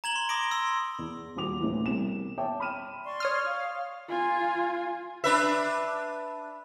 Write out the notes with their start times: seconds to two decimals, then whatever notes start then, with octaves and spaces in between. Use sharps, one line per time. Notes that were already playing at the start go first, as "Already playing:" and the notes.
0.04 A#5 G#6 F#7 G7
0.16 C6
0.29 B5 D6 D#6 A#6 D7 G7
0.51 C6 E6
0.99 E2
1.36 D#1 A#2 F#4 D6 F7
1.60 D2 A2 E3
1.86 C2 B2 E7
2.38 C#5 E5 G5 A5 D6
2.60 B5 F6 D#7 E7
3.05 D5 C6 C#6
3.20 C#5 D#6 F6
3.46 F5
4.08 F4 G#5
5.24 D4 B4 E5